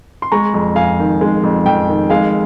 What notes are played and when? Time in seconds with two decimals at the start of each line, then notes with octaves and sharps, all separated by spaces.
0.22 C6
0.32 G#3 A#5 C#6
0.54 F2
0.76 F2 F5 G#5
0.99 D#3
1.21 G#3
1.44 F2
1.66 F2 G5
1.88 D#3
2.10 G#3 F5 G#5